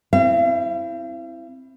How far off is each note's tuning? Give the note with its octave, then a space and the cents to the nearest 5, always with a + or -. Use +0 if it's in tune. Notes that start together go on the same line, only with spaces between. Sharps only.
C4 +0 E4 +0 F5 -45